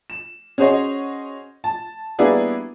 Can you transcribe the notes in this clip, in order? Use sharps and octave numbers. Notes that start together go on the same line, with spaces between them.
E7
C#4 F#4 G#4 C5 C#5 D#5
A5
G3 A#3 B3 D4 E4 G#4